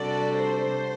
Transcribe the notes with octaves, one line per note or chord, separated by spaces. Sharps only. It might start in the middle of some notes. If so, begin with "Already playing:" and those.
Already playing: C3 G3 D4 F#4 A4 D5
C5